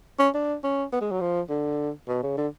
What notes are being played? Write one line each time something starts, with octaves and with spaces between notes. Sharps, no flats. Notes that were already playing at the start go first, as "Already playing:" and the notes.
C#4
D4
C#4
B3
G#3
F#3
F3
D3
B2
C#3
D3